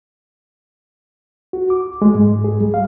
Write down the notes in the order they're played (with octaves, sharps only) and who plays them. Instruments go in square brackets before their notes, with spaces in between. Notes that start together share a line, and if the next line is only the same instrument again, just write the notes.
[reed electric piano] F#4
D6
G#3
G#2
G#4
G3
F5